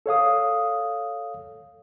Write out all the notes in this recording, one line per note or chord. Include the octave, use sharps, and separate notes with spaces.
A4 C#5 F5 D#6